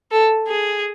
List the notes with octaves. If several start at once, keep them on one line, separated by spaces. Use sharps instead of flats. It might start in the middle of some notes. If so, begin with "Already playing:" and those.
A4
G#4